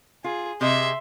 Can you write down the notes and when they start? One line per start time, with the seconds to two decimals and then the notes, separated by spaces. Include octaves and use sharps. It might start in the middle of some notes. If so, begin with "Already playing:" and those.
0.24 F4 G#4
0.61 C3 G#4 D#5 E5 C6